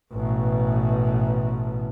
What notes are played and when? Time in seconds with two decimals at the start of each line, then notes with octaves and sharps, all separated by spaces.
0.13 A1 B2